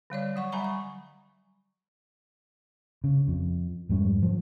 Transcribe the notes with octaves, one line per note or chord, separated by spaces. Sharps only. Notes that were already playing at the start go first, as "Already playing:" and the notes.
D3 G3 C#5 D5
F#3 F#5 C#6
F#3 G3 E5 G#5 A#5 B5
C#6
C#3
F2
F2 G#2 G3 C#4
F3 F#3